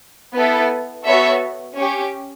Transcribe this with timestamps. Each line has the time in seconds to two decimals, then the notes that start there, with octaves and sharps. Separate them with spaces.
0.34 B3 E4 A4
1.04 B3 F#4 A4 C#5 E5
1.76 C#4 G4 C#5